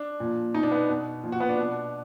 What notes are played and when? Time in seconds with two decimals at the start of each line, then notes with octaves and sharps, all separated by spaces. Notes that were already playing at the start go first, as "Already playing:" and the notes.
Already playing: D4
0.20 A#2 F3
0.54 B2 D#4
0.63 D4
0.72 B3
0.89 B2
1.24 A#2 F3
1.32 F#4
1.40 B3
1.49 D4
1.58 B2